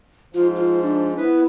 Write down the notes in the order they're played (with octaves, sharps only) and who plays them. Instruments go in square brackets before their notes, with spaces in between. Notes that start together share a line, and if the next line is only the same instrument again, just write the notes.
[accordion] G#2 F3 [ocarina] F4
[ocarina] F4
D4
[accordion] B3 B4 [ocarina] E4